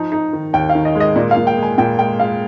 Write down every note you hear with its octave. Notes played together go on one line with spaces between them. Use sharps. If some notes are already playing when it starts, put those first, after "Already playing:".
Already playing: F3 D#4
D#4
D#3
D#2 G5
F5
D#3
D#5
G#3
D#5
A#2 D5
F5
A#2
G5
G#3
G#5
A#2 G5
G#3 G5
G#3 F5